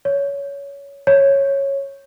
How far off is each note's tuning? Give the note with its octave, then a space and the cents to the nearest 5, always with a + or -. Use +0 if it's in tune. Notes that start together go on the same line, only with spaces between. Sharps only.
C#5 +20
C#5 -10